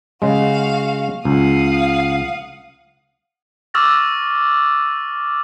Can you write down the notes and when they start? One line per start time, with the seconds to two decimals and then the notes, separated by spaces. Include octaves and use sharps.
0.22 C#3 G#3 F#4 F5
1.25 C#2 F5 F#5 D#6
3.74 C#6 D6 E6 F6 A6 A#6